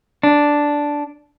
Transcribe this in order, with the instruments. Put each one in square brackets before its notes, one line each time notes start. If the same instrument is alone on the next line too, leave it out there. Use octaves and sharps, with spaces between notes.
[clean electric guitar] D4